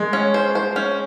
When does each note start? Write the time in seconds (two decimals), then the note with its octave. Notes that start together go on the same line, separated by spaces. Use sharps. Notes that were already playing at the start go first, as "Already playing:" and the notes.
Already playing: G#3
0.13 C#4
0.34 C5
0.55 C5
0.76 C#4